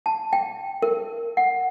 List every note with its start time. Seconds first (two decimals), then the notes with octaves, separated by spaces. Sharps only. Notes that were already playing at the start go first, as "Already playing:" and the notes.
0.06 A5
0.33 G5
0.82 A#4
1.37 F#5